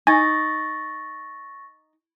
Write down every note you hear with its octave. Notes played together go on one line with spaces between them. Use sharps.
D#4 G#5 C#6 A6 A#6